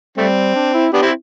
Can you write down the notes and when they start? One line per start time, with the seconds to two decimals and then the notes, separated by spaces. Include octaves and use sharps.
0.18 G3 A3 C4
0.55 D4
0.74 E4
0.93 B3 D4 G4
1.02 C4 E4